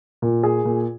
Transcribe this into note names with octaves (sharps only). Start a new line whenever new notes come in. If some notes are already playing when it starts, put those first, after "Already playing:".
A#2
G#4
A#2